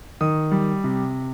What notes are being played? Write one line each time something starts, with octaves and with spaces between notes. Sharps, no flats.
D#3 D#6
G3
C3